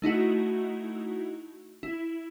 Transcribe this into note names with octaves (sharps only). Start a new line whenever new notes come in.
A3 D#4 E4 F#4
E4